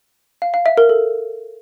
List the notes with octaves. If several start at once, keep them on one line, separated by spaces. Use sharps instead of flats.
F5
F5
E5
A#4
A4